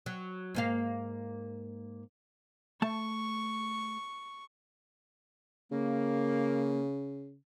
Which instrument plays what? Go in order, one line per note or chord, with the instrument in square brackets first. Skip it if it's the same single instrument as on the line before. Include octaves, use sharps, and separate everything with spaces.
[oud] F#3
G#2 A#3 F5
[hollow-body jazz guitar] A3 A5 [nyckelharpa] C#6
[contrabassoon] C#3 [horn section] A#3